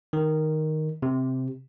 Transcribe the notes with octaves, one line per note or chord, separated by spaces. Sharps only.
D#3
C3